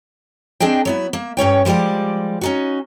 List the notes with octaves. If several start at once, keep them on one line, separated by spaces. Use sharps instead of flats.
C4 D4 G#4 D#5 G5
F#3 B3 E4
A#3 E5
G2 C#4 C#5 G5
F3 G3 G#3 G4 D5
C#4 D#4 F#4